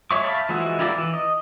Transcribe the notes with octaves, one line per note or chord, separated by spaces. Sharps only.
G#3 C#5 E5 C#6 D6
E5 F5 G5 A5 B5
E3 F3 G#3 E4 F#4
E4 F4 G4 A#4 D5
E3
D#5